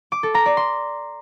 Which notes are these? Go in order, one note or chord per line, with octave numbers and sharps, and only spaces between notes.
D6
A4
A#5
D5
C6